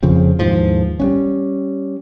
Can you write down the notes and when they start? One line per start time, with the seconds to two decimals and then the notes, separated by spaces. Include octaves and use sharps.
0.03 F2 C#3 F3 C4
0.39 D#2 G#2 E3 F3
1.00 G3 B3 C#4